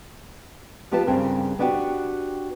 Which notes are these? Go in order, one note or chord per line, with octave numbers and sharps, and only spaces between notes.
F3 B3 G4 B4 F5 A5
G2 C#3 C4 A#4
B3 D4 F#4 G4 F#5